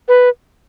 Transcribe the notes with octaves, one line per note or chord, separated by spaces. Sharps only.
B4